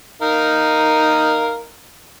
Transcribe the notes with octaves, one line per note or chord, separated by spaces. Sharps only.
D#4 A#4 F5